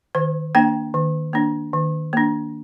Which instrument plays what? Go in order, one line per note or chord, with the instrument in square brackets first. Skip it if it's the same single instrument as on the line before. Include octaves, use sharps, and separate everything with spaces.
[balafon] D#3 C5
A#3 D4 G5
D#3
A#3 D4
D#3
A#3 D4